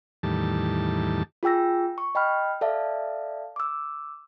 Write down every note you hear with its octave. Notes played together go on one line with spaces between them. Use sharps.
E2 A2 D#3 G3 A5
F4 G#4 G5 E6 A#6
C#6
D#5 G5 B5 F6
A4 D5 E5 F5 A5
D6 E6